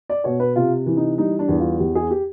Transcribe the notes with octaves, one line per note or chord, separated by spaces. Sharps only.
D5
B2 C#5
B4
C3 F4
E3
D#4
G3 D#4
D4
E2
F4
E2 G4
G#4
G4